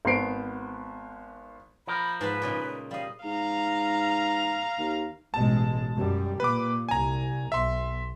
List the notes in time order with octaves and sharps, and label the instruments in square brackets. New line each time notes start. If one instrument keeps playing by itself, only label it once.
[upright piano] G#1 B3 C5 C7 D7
[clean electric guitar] F3 A#4 [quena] B5
[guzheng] G#2 A5 B5 [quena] B4
[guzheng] A#2 C#3 D#4
[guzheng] G3 D#5 [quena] F5
[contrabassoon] G#2 [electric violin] F5 A#5
[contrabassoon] D#2
[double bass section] A1 B2 G#3 [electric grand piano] A5
[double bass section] F#2 G3
[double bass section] A#2 [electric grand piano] B4 D6
[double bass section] C2 [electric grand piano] G#5 A#5
[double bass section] B1 [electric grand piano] E5 C6